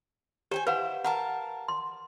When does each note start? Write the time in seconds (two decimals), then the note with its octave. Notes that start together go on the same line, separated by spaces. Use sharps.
0.51 G4 C5 G5 G#5
0.67 E4 B4 C5 F5 F#5
1.04 A#4 F5 F#5 A5
1.68 C6